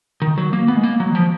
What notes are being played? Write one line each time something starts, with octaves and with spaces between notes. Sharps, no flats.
D#3
F#3
A#3
B3
G#3
A#3
F#3
D#3
F3